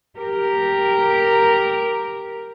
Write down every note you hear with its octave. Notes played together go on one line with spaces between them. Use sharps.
G4 A#4